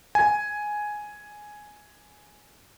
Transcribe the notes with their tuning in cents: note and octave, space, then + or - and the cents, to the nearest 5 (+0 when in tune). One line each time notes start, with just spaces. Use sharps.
G#5 +5